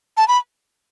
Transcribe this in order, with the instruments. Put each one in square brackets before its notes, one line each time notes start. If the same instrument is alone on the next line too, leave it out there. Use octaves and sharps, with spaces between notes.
[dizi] A5
B5